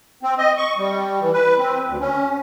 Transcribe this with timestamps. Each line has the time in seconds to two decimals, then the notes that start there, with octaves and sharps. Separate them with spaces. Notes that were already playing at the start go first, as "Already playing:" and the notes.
0.23 C4
0.38 D#5
0.57 C#6
0.78 G3
1.21 E3
1.33 B4
1.59 C4
1.88 D2
2.01 C#4